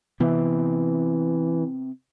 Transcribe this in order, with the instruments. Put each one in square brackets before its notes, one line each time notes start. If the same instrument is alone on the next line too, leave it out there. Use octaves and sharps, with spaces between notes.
[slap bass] C3 B3 C4 [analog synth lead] E3